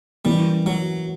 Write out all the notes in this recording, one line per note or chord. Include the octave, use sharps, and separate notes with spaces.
E3 G3 A#3 C#4 E4
F#3